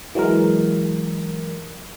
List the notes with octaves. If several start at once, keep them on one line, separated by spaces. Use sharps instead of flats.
E3 F#3 G#3 A#4